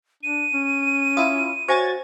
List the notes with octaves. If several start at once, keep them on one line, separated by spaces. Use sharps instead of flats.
D4 D#7
C#4
E4 F4 D#6
F#4 C5 C#5 E5 G#5 G#6 A6